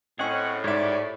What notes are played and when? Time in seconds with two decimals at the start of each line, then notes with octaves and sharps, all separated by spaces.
0.19 A2 C4 C#4 G#4 D#5 F#5 G5 C#6
0.64 G#2 G4 C#5 D5 E5